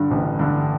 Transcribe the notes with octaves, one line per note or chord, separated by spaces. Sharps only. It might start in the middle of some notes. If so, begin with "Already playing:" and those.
Already playing: G2 D3
A1
G2 D3